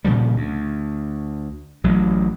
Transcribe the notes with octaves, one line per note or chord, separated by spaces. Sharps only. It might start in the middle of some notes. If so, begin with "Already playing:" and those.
A#2 C#3 F3 G3
D2
A1 F#3